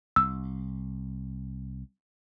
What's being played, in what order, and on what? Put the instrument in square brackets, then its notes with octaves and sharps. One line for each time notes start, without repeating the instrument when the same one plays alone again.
[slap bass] C2 [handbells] E6